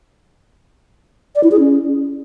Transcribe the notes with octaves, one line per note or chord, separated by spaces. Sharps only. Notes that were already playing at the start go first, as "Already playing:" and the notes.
D5
E4
G#4
C#4